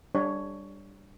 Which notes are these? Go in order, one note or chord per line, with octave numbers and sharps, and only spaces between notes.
G3 D4 C#5